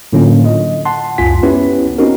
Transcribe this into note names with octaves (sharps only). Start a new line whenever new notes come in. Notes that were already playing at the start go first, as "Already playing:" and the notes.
A2 D3 F#3 A#3 C#4 F4
D#5
F#5 A5 C6
C#2 F#2 F4 G#5 B6
B3 C#4 E4 G4 B4
C4 C#4 D#4 F#4 A#4